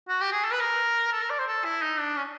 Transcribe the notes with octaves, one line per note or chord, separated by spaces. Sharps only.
F#4
G4
G#4
A4
B4
A#4
A4
A#4
D5
C5
A4
E4
D#4
D4
C#4